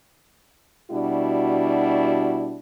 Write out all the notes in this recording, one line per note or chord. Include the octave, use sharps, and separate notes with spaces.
B2 G3 D4 E4 F#4